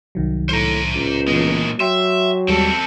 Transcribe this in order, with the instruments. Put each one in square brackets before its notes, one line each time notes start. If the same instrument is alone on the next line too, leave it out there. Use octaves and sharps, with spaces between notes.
[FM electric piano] C2 D#3 F#3
[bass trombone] A2 [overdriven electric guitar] C5 A#5
[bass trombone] C#2
[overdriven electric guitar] A#2 G#3 [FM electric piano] E3 B3
[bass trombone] F#3 [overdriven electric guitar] E5 [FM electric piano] G5 C6
[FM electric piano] D#2 G3 G#3 [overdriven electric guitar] C4 A4